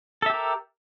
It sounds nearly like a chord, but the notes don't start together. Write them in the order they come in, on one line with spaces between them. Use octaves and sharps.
A4 E5 G4 A#4